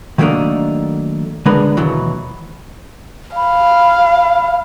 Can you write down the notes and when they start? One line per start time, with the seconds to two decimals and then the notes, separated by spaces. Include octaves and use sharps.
0.18 D#3 F#3 A3 A#3 D4 D#4
1.46 D3 G#3 B3 D4 A#4 B4
1.77 D#2 B2 E3 F#3
3.36 F5 B5